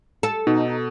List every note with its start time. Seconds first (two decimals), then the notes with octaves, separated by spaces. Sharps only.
0.23 A4
0.47 B2 D#4